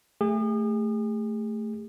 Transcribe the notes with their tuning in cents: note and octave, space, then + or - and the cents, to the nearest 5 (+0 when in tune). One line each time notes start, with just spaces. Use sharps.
A3 +0 G#4 -40